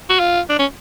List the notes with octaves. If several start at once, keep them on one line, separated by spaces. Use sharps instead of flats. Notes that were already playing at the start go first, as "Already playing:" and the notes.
F#4
F4
D4
C#4